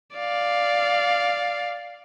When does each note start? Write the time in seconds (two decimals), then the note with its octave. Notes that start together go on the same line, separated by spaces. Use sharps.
0.16 D5 F5